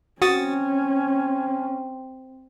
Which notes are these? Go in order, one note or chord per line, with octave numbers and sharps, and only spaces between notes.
C4 C#4 F#4 D#6 A6